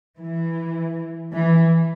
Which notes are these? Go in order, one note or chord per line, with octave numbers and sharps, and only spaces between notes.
E3
E3